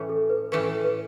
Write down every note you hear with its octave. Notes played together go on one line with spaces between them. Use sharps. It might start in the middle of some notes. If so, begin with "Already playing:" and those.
Already playing: A2 E3 A3 C#4
A4
B4
A2 E3 A3 C#4 B4
A4
B4